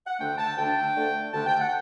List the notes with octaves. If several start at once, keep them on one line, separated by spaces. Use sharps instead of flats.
F#5
D2 D3 A3 D4 G5
A5
D2 D3 A3 D4 G5
D2 D3 A3 D4
D2 D3 A3 D4 A5
G5
F#5